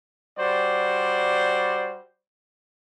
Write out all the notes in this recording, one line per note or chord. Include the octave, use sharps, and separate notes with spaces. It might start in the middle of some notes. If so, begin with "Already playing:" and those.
G3 F#4 C5 D5